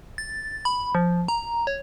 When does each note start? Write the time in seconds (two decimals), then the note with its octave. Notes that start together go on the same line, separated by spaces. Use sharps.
0.18 A6
0.65 B5
0.95 F3
1.28 A#5
1.67 C#5